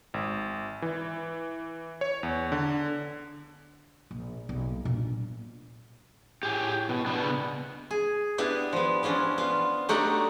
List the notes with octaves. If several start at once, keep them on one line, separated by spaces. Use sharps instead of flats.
G#1
E3
C#5
E2
D3
A#1
B1
A#2 D4
A2 G4 G#4
B2
B2 B3 D4
C#3
G#4
B3 D4 E4 G4
F3 B3
E3 F3 C#4 D4
B3 F4
F#3 A3 D4 D#4 G4 F#5